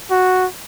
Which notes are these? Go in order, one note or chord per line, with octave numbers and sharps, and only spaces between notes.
F#4